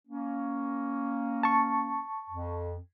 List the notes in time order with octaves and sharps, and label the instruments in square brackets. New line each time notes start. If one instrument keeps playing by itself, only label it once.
[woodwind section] A#3 C#4
[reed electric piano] A5 C#6
[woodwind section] F2